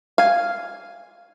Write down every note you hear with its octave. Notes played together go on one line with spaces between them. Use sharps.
F5 G#5